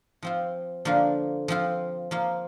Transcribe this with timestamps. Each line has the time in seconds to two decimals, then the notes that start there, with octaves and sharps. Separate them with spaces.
0.22 F3 C4 F4
0.85 D3 F3 A#3 D4 F4
1.48 F3 C4 F4
2.11 F3 A#3 F4